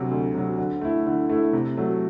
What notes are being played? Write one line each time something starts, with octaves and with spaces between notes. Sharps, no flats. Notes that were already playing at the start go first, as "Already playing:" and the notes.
Already playing: D2 C3 F#3
D2
C3 F#3
D3
A3 E4
D3
A3 E4
C3
F#3 A3